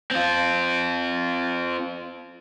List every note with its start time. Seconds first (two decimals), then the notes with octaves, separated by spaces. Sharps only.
0.11 C4 F4